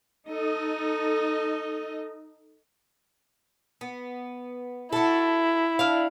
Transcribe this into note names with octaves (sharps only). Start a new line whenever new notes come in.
D#4 A4 D#5
B3
E4 F#4 A4
D4 F5